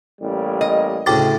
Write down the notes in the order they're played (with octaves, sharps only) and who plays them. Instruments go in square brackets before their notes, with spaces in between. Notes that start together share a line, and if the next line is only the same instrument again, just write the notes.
[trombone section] A1 G3 A#3
[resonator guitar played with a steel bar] D#5
[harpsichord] D2 A2 C#3 [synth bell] G5 D6 A6